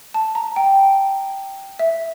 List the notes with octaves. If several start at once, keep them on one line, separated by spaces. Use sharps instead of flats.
A5
A#5
G5
E5